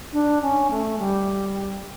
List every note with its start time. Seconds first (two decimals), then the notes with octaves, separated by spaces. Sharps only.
0.13 D4
0.42 C#4
0.71 A3
0.99 G3